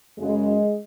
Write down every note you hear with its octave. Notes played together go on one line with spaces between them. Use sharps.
F#2 C#3 G#3